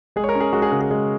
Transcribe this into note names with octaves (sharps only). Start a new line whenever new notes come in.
G#3 G#4
C#5
A#4
C#4
G#4
G#3 F#4
G#4
C#3 A#4
G#4
G#3